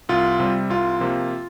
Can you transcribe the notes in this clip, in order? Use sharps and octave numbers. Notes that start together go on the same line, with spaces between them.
C2 F4
C3 G3
C2 F4
C3 F3 A#3